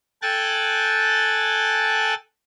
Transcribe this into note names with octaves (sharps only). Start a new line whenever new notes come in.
A4 G5 G#5 F#6 A6